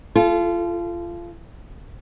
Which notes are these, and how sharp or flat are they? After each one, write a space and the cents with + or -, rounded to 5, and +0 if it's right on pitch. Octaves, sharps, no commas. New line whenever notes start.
F4 -25 A4 -30